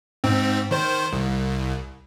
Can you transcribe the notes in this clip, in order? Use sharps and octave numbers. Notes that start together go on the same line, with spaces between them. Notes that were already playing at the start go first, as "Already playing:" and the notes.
G#2 C4
D#3 C5
C2